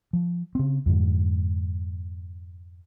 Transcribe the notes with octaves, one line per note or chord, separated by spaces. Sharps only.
F3
C#3 C4
F2 G#2 D3